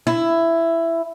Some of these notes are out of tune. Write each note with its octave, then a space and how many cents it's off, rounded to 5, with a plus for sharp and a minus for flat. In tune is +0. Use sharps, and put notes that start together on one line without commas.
E4 +10